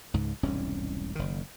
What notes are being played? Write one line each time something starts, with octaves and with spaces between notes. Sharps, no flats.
C#2 G#2
E1 C2 G#2 C#4
F#1 D#3